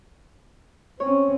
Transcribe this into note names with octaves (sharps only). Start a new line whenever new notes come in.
C4 C#4 C#5